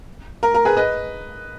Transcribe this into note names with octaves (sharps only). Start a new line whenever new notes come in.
A#4
A#4
G#4 B4
B4 D#5